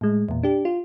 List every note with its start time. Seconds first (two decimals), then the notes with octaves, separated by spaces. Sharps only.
0.01 A2 G#3
0.29 E2 A#2
0.43 D4 G4
0.65 F4